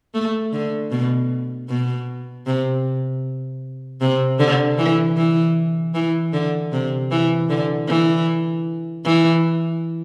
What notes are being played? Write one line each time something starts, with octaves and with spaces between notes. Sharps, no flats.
A3
D3
B2
B2
C3
C3
D3
E3
E3
E3
D3
C3
E3
D3
E3
E3